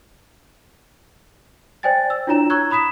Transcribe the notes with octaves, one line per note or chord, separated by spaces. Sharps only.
C5 D5 G5 G#5 A6
E6
D4 E4 F4 C#5 A#5 E7
A#5 C#6 E6 F#6 G#6
A#5 B5 D#6 B6 E7